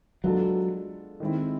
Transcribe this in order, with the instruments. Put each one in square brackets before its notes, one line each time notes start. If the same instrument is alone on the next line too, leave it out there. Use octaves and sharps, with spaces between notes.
[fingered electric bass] F#3 [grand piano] G#3 B3 D4 F4 A4
[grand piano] D#3 G#3 C4 E4